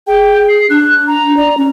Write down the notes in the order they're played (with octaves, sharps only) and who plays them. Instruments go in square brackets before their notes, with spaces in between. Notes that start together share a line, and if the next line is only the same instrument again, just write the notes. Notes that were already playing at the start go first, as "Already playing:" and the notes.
[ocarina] G#4 [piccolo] G5
[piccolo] C7
[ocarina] D4 [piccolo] F#6
[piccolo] A#5
[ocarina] D5
C#4